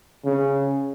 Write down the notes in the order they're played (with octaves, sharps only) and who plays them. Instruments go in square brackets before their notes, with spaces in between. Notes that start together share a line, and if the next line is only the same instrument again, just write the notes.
[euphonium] C#3